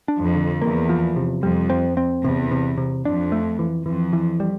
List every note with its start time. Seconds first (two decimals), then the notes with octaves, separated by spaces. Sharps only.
0.08 D4
0.22 F2
0.36 D3
0.62 E2 A#3
0.89 F3
1.16 C3
1.43 F2 G3
1.70 C4
1.97 C4
2.24 E2 C3
2.51 C3
2.78 C3
3.05 F2 D4
3.32 A3
3.59 E3
3.86 F2 E3
4.13 E3
4.40 G3